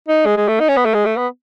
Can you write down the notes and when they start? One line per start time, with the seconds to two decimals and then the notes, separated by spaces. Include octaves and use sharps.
0.08 D#4
0.26 G#3
0.37 G#3
0.48 A3
0.60 D#4
0.69 C#4
0.77 B3
0.86 A3
0.94 G#3
1.06 A3
1.17 B3